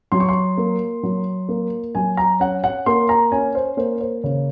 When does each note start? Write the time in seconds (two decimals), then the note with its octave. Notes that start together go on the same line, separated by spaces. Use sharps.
0.12 F#3 C6
0.20 C#6
0.29 C6
0.57 A#3
1.03 F#3
1.49 A#3
1.95 F#3 G#5
2.17 A#5
2.40 C#4 F#5
2.64 F#5
2.86 A#3 C6
3.09 A#5
3.32 C#4 G#5
3.55 C5
3.77 A#3 C5
4.01 C5
4.23 C#3 C#5